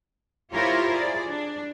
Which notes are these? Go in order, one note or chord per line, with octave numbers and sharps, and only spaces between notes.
E4 F4 G4 A#4 C5 C#5
G#4 D5
D4